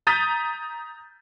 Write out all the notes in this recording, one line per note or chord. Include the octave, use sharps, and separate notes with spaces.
A#5 D#6 G6 A6 B6 D#7